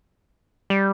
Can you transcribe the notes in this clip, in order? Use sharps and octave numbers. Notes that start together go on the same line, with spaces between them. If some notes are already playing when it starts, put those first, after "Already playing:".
G3